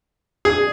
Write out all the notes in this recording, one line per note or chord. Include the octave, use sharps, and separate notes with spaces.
G#4